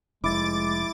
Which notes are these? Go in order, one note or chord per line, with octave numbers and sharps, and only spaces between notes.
F1 G#3 E4 D6 A6